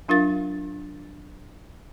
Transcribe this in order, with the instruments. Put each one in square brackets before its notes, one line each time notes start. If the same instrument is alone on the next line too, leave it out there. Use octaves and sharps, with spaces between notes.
[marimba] F#3 D4 F4 A#4 F5 A6